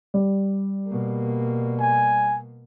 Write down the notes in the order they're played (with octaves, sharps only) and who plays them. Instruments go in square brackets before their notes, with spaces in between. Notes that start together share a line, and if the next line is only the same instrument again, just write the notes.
[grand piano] G3
[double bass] B2 A#3
[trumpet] G#5